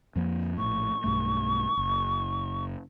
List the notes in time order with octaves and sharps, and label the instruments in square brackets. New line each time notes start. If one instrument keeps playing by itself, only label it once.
[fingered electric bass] F2 F3 A#3
[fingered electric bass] A#1 A2 [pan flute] C#6
[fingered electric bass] B1 G2 A3
F#1